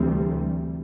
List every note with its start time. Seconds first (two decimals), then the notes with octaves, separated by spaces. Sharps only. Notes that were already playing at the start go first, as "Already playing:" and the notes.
Already playing: D2 C3 E3 G3 C4